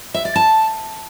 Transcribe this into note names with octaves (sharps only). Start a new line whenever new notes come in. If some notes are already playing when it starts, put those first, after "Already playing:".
E5
D5
A5